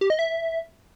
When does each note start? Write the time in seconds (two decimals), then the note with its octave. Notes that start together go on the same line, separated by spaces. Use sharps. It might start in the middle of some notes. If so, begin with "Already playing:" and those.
0.01 G4
0.10 D#5
0.19 E5